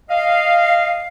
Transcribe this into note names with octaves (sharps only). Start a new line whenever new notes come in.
D#5 F5